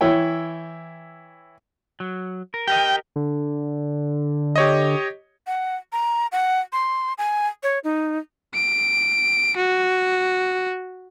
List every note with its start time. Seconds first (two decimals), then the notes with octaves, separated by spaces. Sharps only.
0.01 E3 E4 C#5 G5
2.00 F#3
2.54 A#4
2.68 G4 A#4 D#5 G5
3.16 D3
4.56 G4 C#5 D#5
5.47 F#5
5.92 A#5
6.32 F#5
6.73 C6
7.18 G#5
7.63 C#5
7.84 D#4
8.54 D7
9.57 F#4